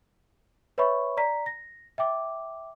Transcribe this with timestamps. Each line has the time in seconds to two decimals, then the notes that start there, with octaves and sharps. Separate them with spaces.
0.78 B4 C#5 E5 B5 C#6
1.17 D5 A#5 B6
1.46 A#6
1.98 E5 G5 D6